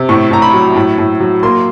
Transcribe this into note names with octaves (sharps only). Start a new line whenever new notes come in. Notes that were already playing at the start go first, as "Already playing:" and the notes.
Already playing: C3
A2 C#6
A2 A#5
B5
F#3
A2
A2
F#3
A#3 C6